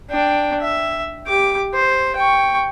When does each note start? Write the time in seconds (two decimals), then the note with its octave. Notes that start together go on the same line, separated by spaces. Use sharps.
0.10 D4 G5
0.61 E5
1.27 G4 D6
1.74 C5
2.16 G5 C#6